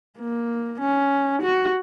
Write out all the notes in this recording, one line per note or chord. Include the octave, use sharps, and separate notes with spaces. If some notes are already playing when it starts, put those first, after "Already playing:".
A#3
C#4
F#4